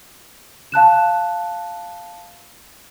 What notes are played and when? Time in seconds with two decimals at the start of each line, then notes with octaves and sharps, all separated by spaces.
0.72 F5 A5 F#6 E7